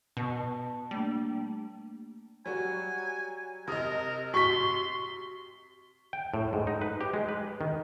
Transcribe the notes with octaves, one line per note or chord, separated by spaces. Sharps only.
B2 A5
G3 A3 A#3 D4
F#3 G3 F#4 G#5
C3 A#4 D#5 A5 D#6
F#4 C6 C#6 B6
G5
A2
G#2
D#4
B4
G4
G#3
B4
D#3